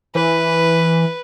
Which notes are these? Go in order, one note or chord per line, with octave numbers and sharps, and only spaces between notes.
E3 B4